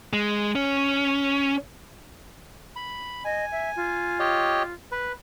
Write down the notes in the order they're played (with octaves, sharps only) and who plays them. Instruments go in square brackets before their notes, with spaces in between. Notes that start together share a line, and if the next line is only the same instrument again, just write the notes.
[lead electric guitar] G#3
C#4
[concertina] B5
[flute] D#5 [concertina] G#5
[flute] E5
F4
[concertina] G4 C#5 D#5
B4